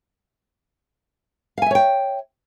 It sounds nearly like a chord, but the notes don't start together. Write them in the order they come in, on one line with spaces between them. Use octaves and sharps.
F5 G#5 E5 C#5 G5